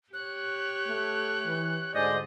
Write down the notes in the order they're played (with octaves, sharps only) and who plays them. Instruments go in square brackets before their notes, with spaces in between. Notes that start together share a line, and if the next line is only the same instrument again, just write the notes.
[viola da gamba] G4 C#5 [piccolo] F#6
[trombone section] A3
E3
[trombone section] D2 G#2 D3 [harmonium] G#4 C5 D5 [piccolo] D#5